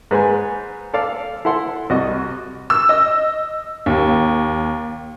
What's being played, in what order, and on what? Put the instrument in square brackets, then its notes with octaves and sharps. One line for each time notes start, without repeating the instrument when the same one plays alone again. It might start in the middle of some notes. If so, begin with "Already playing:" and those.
[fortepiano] G#2 B4 C5 G#5
A4 D5 F5
E4 A4 F#5 C6
C2 F#4 D#5
[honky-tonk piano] E6
D#5
D#2